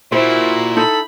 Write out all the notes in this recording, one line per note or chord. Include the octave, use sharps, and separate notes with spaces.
A#2 E4 F#4 C5
D#4 A4 B5